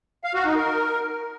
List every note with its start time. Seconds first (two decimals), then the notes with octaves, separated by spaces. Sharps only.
0.24 F5
0.35 F#4
0.45 D#4
0.56 A#4